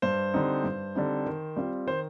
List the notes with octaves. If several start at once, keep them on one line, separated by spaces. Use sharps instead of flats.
G2 C5
D3 G3 C4 D#4
G2
D3 G3 C4 D#4
D#3
G3 C4 F4
D#3 C5